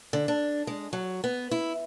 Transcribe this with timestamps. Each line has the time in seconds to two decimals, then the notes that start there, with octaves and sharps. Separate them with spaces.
0.13 D3
0.28 D4
0.67 G#3
0.93 F#3
1.24 B3
1.51 E4